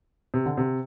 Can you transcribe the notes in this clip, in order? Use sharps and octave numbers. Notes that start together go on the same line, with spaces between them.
C3
D3
C3